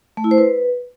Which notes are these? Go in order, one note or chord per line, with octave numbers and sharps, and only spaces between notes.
A3
E4
C5
B4